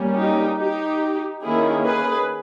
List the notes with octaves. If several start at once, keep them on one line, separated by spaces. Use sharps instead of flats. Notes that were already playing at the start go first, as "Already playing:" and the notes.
Already playing: G3 A#3 C#4
D#4 G4
D#4 G4
D#3 A#3 C#4 E4 G#4
G#4 B4